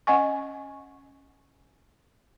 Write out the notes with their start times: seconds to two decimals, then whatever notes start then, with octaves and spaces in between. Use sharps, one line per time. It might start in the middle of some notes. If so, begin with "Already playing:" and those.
0.07 C#4 D#5 F#5 G#5 C#6